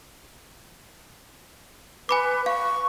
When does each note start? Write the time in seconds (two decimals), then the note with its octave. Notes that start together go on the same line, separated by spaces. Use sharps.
2.09 B4 G#5 B5 D6
2.46 F5 C#6